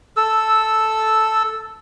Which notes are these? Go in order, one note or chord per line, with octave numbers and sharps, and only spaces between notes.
A4 E6